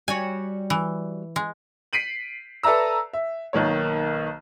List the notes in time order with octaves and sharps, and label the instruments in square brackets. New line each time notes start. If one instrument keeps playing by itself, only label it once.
[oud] G3 F#4 C#5 [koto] G#5
[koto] E3
G#3
[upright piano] B6 C7 D7 D#7 F#7
A4 B4 D5 E5 A#5 E6
E5
B1 D#3 A#3 C#5